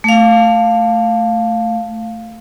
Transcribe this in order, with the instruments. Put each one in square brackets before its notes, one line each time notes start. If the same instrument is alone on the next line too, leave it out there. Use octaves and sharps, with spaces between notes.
[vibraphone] A3 F5